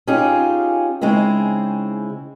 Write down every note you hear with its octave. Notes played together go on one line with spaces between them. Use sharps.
C#4 D#4 F4 G4 G#4
C#3 G#3 C4 D#4 E4